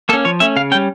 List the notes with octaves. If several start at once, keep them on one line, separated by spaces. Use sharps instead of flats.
A#3 C#4 A4
F3 C#5
A3 C#4 E5
C#3 F5
G3 C#4 G5